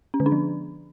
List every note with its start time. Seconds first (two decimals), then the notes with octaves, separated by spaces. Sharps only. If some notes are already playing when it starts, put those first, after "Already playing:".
0.14 C#4
0.20 D3
0.26 D4
0.32 F3